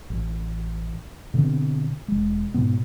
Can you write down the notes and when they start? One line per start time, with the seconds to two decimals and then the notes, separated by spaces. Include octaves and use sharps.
0.10 A1
1.34 B2 D3 B3 C4
2.08 E1 G#3
2.54 G#2 B2 B3